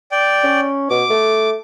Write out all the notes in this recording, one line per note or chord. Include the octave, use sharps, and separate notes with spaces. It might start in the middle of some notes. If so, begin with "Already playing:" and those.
D5 G5
C#4
B2 D6
A3